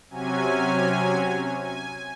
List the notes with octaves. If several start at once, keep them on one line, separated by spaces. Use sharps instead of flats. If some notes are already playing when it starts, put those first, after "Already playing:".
C3 F#3 C#4 G#5
G#5